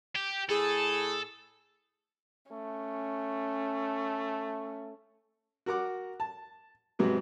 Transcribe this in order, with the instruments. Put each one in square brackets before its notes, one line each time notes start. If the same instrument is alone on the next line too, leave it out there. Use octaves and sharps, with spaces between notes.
[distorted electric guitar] G4
[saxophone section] A2 G#4 [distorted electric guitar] A4
[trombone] A3 [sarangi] C#4
[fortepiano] F#4 A#4 F#5 D6
A5
G#2 C3 F#3 B3 F#4